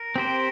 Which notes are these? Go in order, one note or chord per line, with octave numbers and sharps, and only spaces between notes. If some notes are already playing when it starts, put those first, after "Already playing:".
Already playing: A#4
C4 G4 C5